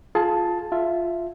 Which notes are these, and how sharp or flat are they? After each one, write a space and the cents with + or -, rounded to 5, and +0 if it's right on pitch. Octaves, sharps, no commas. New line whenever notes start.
F4 +0 G#4 +30 A5 +0
F4 +0 E5 +10